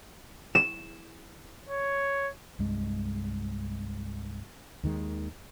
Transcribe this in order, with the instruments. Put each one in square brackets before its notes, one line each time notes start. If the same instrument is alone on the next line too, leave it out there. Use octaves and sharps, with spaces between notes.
[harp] E7
[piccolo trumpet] C#5
[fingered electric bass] C2 G2 G#3
[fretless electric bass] D#2 D#3 G#3